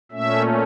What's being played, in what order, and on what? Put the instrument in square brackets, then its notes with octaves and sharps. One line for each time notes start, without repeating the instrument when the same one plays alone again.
[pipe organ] A#2 A3 C#4 E5